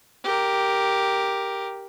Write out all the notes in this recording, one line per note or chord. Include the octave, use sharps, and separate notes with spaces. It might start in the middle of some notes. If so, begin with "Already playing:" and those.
G4 A#4